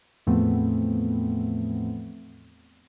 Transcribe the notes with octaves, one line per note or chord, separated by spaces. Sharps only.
E2 A2 F3 A3 B3 C4